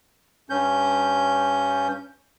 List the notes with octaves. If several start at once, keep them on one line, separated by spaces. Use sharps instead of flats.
G2 C#4 G6